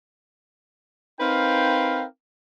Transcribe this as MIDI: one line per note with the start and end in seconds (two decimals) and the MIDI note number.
1.20 2.04 60
1.20 2.04 63
1.20 2.04 70
1.20 2.04 71
1.20 2.04 77
1.20 2.04 79